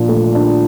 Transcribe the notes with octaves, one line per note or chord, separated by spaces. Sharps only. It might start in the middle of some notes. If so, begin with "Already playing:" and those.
Already playing: A#2 F3 D4
A3
D4